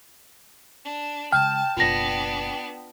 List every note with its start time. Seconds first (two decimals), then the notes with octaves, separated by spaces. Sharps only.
0.85 D4
1.32 C#3 G#3 G5 A5 F6
1.77 F#1 B2 B3 D4 F4 A#6